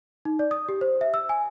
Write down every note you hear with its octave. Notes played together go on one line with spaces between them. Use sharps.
D#4
D5
D#6
G4
C5
E5
E6
G#5